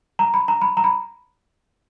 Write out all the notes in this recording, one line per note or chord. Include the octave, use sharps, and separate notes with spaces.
A#5
B5
A#5
B5
A#5
B5